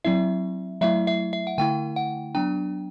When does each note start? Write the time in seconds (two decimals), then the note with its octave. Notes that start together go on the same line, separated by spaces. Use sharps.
0.04 F#3 C4 E4 E5
0.81 F#3 A3 E4 E5
1.07 E5
1.33 E5
1.47 F#5
1.58 D3 A3 E4 G5
1.96 F#5
2.35 F#3 B3 D4 G5